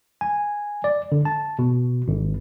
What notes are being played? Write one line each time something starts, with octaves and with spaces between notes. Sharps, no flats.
G#5
D5
D3
A5
B2
G#1